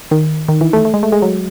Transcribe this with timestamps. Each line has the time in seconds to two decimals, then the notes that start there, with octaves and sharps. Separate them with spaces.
0.11 D#3
0.48 D#3
0.61 E3
0.73 A3
0.85 A3
0.94 G#3
1.03 A3
1.12 G#3
1.22 F#3